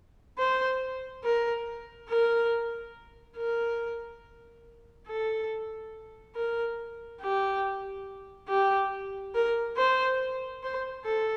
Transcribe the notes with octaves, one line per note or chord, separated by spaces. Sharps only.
C5
A#4
A#4
A#4
A4
A#4
G4
G4
A#4
C5
C5
A4